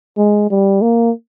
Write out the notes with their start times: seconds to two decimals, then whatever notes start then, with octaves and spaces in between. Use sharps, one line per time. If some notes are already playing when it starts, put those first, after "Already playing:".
0.18 G#3
0.51 G3
0.82 A#3